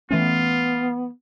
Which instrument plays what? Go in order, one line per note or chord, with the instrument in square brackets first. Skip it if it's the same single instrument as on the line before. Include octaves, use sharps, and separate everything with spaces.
[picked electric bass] E3 A3 C#4 [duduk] B3 [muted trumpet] F4